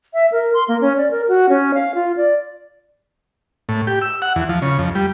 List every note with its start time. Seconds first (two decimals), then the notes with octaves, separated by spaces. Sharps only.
0.14 E5
0.32 A#4
0.54 C6
0.68 A#3
0.81 C#4
0.97 D5
1.11 A#4
1.28 F#4
1.49 C#4
1.74 F5
1.95 F4
2.17 D5
3.69 A2
3.87 G4
4.02 E6
4.22 F#5
4.36 E2
4.49 F3
4.62 C#3
4.79 F2
4.95 G3